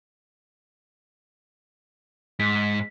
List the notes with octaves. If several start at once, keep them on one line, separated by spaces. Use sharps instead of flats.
G#2 B6